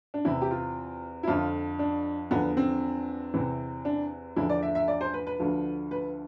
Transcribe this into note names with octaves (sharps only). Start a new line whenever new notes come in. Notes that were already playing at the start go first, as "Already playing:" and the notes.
D4
E2 C3 E3 E4
G4
F4
E4
F2 D3 F3 F4
D4
E2 D3 F3 B3
C4
E2 C3 E3
D4
E2 D3 F3 E4
D5
E5
E5
D5
C5
B4
B4
D2 D3 F3
B4